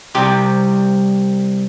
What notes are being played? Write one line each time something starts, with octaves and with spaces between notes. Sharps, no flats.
C2 C3 G3 G4